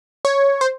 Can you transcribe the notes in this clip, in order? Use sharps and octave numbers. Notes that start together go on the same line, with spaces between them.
C#5
C5